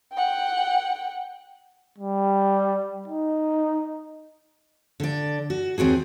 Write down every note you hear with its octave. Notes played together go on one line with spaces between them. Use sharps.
F#5 G5
G3
D#4
D3 D5
F#4
D#2 C4 F#4 G#4